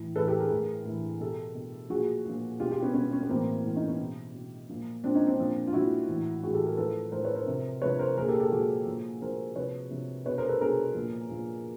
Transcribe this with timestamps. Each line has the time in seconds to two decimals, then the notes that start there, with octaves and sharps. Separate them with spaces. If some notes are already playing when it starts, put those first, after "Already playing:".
Already playing: A2 E3
0.16 A2 E3 A4 B4
0.28 G4 A4
0.39 G#4 A#4
0.51 A2 E3
0.85 A2 E3
1.20 B2 G4 A4
1.55 B2
1.90 A#2 F3 F#4 G#4
2.25 A#2 F3
2.60 B2 F4 G4
2.71 F4 G4
2.83 B3 C#4
2.94 B2 B3 C#4
3.12 B3 C#4
3.23 B3
3.29 A2 E3 A#3 C4
3.64 A2 E3
3.75 C#4 D#4
3.88 B3 C#4
3.99 B2
4.34 B2
4.69 A#2 F3
5.03 A#2 F3 C4 D4
5.15 C#4 D#4
5.27 C4 D4
5.38 A#2 F3
5.67 F4
5.73 A#2 F3 E4 F#4
6.08 A2 E3
6.43 A2 E3 F#4 G#4
6.54 G4 A4
6.65 G#4 A#4
6.78 A2 F3 A4 B4
7.12 A2 F3 A#4 C5
7.24 B4 C#5
7.35 A#4 C5
7.47 C3 F3
7.82 C3 F3 B4 C#5
7.99 A#4 C5
8.17 A#2 F3 G#4 A#4
8.28 G4 A4
8.40 G4 A4
8.51 A#2 F3 F#4 G#4
8.87 A#2 F3
9.21 A#2 F3 A#4 C5
9.56 C3 F3 B4 C#5
9.91 C3 F3
10.26 B2 B4 C#5
10.37 A#4 C5
10.48 A4 B4
10.61 B2 G#4 A#4
10.95 A#2 F3
11.30 A#2 F3